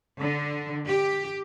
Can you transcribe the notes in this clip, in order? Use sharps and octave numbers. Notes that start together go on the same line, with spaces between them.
D3
G4